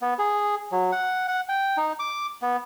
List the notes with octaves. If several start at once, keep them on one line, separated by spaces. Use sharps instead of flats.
B3
G#4
F#3
F#5
F#5
G5
D#4
D6
B3